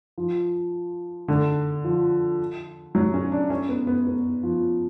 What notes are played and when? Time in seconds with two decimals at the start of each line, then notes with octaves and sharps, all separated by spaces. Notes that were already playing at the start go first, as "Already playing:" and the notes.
0.18 F3
1.28 D3
1.84 F3
2.95 F#3
3.14 C#4
3.32 D4
3.50 C#4
3.69 B3
3.87 B3
4.07 B3
4.43 F3